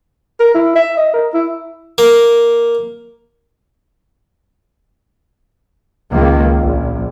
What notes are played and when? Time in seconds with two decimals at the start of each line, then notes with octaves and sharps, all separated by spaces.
0.40 A#4
0.55 E4
0.76 E5
0.97 D#5
1.14 A#4
1.34 E4
1.98 A#3
6.11 C#2 D#3 A#3
6.58 A#1